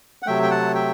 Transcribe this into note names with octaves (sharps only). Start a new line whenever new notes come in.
F#5
C3 F#3 A3 E5 G5
G5
F#5 A5
E5 G5